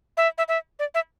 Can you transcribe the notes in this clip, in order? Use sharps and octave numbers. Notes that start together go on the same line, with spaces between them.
E5
E5
E5
D5
E5